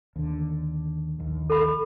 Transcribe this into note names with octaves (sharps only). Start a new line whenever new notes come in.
D#2 D3
A#1 D#2
A4 B5